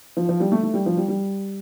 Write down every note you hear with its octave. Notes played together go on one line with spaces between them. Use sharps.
F3
F3
G3
A3
A3
G3
F3
G3
G3